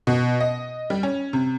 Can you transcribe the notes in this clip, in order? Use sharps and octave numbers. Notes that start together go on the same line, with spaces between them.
B2
D#5
G3
C#4
C3